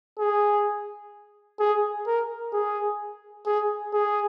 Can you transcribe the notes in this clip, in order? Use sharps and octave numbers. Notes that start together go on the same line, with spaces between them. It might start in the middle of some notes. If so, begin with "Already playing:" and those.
G#4
G#4
A#4
G#4
G#4
G#4